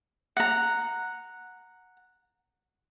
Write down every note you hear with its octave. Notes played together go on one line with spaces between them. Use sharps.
F#5 A#5